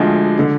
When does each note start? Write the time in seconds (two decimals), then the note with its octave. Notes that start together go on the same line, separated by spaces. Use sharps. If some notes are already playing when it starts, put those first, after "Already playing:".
Already playing: D2 D3 F3 G#3 G#4
0.39 D3